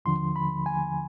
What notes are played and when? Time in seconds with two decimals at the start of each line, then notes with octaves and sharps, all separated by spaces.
0.05 D#2 D3 F3 C6
0.36 B5
0.66 G#5